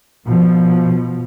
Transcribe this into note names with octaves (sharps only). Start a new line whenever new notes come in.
B2 F3